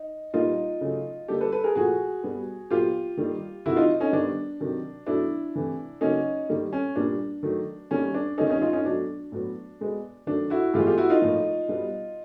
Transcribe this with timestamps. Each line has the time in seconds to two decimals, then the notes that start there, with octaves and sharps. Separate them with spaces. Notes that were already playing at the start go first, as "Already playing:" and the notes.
Already playing: D#4
0.34 A#2 G3 A#3 D#4 F4
0.81 C#3 F#3 A3
1.28 D3 G3 A#3 G4 A4
1.41 A4 B4
1.52 A4 B4
1.64 G#4 A#4
1.75 A#2 F3 A3 F#4 G#4
2.23 B2 G3 B3
2.70 A#2 F#3 B3 F4 G4
3.18 D#3 G3 A#3
3.65 C3 D#3 F#3 E4 F#4
3.76 D#4 F4
4.00 C#4 D#4
4.12 D#3 G3 B3 D4
4.60 C3 D#3 F#3
5.06 B2 F#3 A3 D4 E4
5.55 C3 E3 A3
6.01 C#3 F#3 A#3 C#4 D#4
6.49 D#3 G3 A#3
6.73 C#4
6.96 A#2 G3 A#3 D4
7.43 D#3 F#3 A3
7.91 D#3 G3 A#3 C#4
8.14 D4
8.38 D#3 G3 B3 C#4 D#4
8.50 C#4 D#4
8.62 D#4 F4
8.73 C#4 D#4
8.85 B2 F#3 A3 D4
9.32 A2 F#3 B3
9.80 B2 G#3 B3
10.27 D#3 F#3 A3 D4
10.50 E4 F#4
10.74 A2 E3 G#3 B3 F4 G4
10.87 F4 G4
10.98 E4 F#4
11.10 D#4 F4
11.21 A2 F3 A#3
11.68 B2 G3 B3